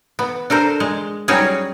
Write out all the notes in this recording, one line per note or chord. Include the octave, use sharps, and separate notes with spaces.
B3
D4 A4 A#4 C5
G#3
F#3 G3 C#4 D#4 F#4 G#4